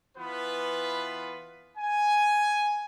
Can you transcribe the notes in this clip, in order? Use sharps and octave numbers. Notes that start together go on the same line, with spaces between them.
E3 B3 F4 B4
G#5